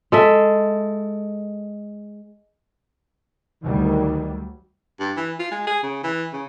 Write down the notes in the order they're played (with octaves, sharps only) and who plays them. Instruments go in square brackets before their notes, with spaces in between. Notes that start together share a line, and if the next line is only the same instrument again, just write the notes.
[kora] G#3 A4 E5
[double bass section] D2 F#3 G3 [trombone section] D#3
[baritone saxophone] G2
E3
F4
G#3
G#4
C#3
E3
C#3